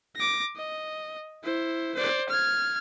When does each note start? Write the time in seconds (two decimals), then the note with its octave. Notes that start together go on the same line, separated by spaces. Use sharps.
0.16 D6 A#6
0.56 D#5
1.43 E4 C5
1.95 C5 D5
2.29 F6 G#6